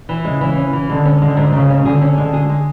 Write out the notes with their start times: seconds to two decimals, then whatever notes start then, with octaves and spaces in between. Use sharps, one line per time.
0.09 E3
0.25 C#3 G#3
0.41 E3
0.57 C#4
0.73 E3
0.89 D3 G#3
1.05 C#4
1.21 D3 G#3
1.37 G#2
1.53 G#2 C#3
1.69 C#4
1.85 D3 G#4
2.02 C#4
2.18 D3 G#3
2.33 G#4
2.50 G#3